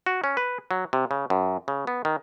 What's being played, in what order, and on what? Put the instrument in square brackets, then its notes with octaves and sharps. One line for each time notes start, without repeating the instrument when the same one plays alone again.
[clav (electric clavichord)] F#4
C#4
B4
F#3
C3
C#3
F#2
C#3
B3
D#3